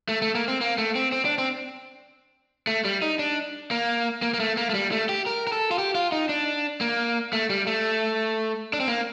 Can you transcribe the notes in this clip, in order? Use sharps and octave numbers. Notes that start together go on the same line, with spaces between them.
A3
A3
A#3
C4
A#3
A3
C4
C4
D4
C4
A3
G3
D#4
D4
A#3
A#3
A#3
A3
A#3
A3
G3
A3
G4
A#4
A#4
A4
F4
G4
F4
D#4
D4
A#3
A3
G3
A3
D4
C4
A#3